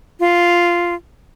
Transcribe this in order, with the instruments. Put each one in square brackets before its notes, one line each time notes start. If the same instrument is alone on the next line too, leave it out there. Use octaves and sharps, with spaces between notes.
[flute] F4